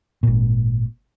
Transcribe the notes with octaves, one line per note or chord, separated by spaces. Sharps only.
G#1 A#2